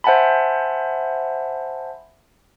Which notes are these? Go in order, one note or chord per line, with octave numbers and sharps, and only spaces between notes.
C5 E5 F#5 G#5 A5 B5